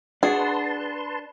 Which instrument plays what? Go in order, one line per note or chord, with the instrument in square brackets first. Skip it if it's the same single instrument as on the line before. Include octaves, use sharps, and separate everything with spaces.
[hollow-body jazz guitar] D4 F#4 [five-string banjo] G#4 [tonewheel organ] B4 A5 C6